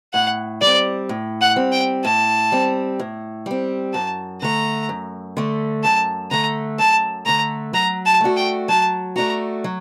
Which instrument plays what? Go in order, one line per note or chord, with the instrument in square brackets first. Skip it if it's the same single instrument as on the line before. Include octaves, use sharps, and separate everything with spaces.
[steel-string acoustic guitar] A2 [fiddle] F#5
[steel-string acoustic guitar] G3 [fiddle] D5
[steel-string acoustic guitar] C4
A2
[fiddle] F#5
[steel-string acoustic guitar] G3 C4
[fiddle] G5
[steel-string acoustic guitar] A2 [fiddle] A5
[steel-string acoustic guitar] G3 C4
A2
G3 C4
[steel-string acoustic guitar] F#2 [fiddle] A5
[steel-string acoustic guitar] D3 A3 [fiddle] A#5
[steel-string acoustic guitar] F#2
D3 A3
[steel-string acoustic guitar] F#2 [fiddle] A5
[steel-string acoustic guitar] D3 A3 [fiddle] A#5
[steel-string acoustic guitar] F#2 [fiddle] A5
[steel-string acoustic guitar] D3 A3 [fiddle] A#5
[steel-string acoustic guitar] F#3 [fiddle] A#5
[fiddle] A5
[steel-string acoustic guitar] A3 D4 F#4
[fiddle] G5
[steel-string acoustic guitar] F#3 [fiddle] A5
[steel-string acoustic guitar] A3 D4 F#4 [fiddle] A#5
[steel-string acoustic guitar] F#3